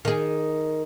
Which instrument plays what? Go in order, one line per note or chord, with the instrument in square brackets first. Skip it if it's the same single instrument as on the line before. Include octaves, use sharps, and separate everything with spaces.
[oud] D#3 G#4